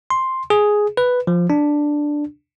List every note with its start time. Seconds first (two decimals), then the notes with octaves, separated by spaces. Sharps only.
0.10 C6
0.50 G#4
0.97 B4
1.27 F3
1.50 D4